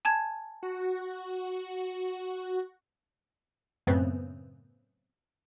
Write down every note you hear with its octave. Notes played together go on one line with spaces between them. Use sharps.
G#5 A5 G#6
F#4
F#2 A2 C#3 B3 C4